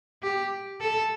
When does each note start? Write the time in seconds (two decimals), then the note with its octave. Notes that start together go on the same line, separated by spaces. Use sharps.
0.22 G4
0.81 A4